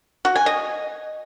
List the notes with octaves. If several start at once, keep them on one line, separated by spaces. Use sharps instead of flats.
F#4
G#5
D#5